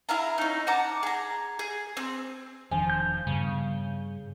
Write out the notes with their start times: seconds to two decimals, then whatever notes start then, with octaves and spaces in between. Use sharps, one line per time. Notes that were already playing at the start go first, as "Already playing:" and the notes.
0.09 E4 G#4 F5 A#5
0.38 C#4 D#4
0.67 F#5 A5 A#5 D6
1.03 G#4 A#5
1.59 G#4
1.97 C4
2.71 E1 D#3 F3 D4 G#5
2.90 G6
3.27 G2 C#3 B3